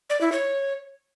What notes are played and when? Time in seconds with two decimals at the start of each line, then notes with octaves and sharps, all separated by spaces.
0.10 D5
0.21 E4
0.32 C#5